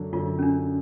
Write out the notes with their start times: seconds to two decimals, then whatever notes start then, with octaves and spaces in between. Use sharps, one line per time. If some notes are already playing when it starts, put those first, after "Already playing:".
Already playing: F#2 D3 F#3
0.13 F#2 D3 F#3 F4
0.39 C#4
0.43 D4